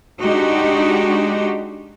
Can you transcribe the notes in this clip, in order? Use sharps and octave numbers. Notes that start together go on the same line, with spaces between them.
G#3 D4 D#4 F#4 G4